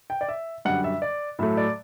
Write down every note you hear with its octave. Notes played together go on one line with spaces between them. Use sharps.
G5
D5
E5
F#2 D3 G3 F#5
E5
D5
A2 F#3 A3 E5
D5